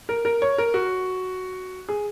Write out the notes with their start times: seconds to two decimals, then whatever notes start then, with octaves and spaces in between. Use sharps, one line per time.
0.09 A#4
0.25 A#4
0.42 C#5
0.58 A#4
0.74 F#4
1.89 G#4